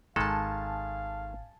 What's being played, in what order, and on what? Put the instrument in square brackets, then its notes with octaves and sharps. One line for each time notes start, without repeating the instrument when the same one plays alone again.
[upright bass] G#1 [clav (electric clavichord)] D#3 G#3 A4 [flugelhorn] F5 [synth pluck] G#5 A5